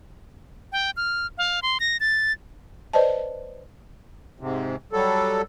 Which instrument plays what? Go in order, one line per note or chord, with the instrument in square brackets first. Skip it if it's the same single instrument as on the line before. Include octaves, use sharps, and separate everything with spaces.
[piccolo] G5
F6
F5
C6
A#6
A6
[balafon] B4 C5 D5 D#5 A5
[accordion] G#2 C3
F#3 G3 A4